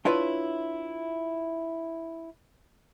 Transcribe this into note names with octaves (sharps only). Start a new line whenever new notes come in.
D4 E4 F4 B4 C#5 E5